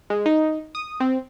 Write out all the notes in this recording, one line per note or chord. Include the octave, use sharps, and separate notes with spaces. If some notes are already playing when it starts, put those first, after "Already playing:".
G#3
D#4
D#6
C4